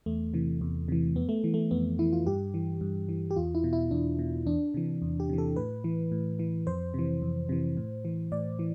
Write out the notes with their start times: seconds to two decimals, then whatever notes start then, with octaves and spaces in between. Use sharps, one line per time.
0.06 E2 A3
0.34 C3 E3
0.61 E2
0.88 C3 E3
1.16 F2 B3
1.29 A3
1.44 E3
1.54 A3
1.71 F2 B3
1.99 E3 E4
2.13 F4
2.26 G2 G4
2.54 E3
2.81 G2
3.09 E3
3.31 G4
3.36 E2 F4
3.55 E4
3.64 B2
3.73 E4
3.91 E2 D4
4.19 B2
4.46 E2 D4
4.74 C3 E3
5.02 E2
5.20 G4
5.29 C3 E3
5.38 A4
5.56 A2 B4
5.84 E3
6.12 A2
6.39 E3
6.67 F2 C5
6.94 C3 E3
7.22 F2
7.49 C3 E3
7.77 A2
8.05 E3
8.32 A2 D5
8.59 E3